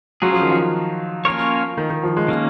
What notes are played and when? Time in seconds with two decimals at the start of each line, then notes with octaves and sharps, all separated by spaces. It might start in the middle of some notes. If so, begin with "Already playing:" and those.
0.22 F#3 C#4 F4 G#4
0.32 F3
0.42 D#3
0.51 F3
1.25 A#3 C#4 F4 A#4 C#5
1.77 D#3
1.90 D#3
2.03 F3
2.17 G#3
2.28 D#3 A#3 C#4